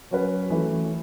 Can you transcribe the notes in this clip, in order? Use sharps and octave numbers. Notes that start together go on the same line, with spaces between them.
F#3 C#4 F#4 B4
E3 A3 C#4 E4